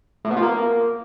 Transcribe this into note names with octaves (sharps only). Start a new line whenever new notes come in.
A2
B2
F3
A#3